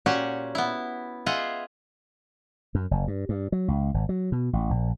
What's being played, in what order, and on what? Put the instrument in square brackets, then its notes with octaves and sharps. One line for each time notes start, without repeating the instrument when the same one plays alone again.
[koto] A#2 C#4 F#4 G4 F#5 G#5
B3 E4
F4 G#4 D#5 E5 F#5
[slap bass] F#2
F#1
G2
G2
F#3
C#2
G#1
F#3
B2
A1
A#1